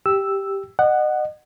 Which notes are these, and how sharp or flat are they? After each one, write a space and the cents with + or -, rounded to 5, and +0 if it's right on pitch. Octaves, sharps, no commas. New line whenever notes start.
G4 +0 E6 +0
D#5 -35 F#5 +0